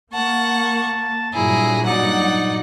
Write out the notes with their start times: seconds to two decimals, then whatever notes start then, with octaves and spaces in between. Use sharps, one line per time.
0.14 A#3 F#5 A5 C#6
1.34 G2 A#2 F#3 E4 G#4 A#5
1.86 D#4 D5 F#5